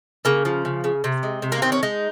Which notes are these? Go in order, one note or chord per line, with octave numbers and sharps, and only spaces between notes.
C#3 A#3
F3
C#3
C#3
C3
G#3
C3
A#3
D#3 C4
C#4
G#3 D#4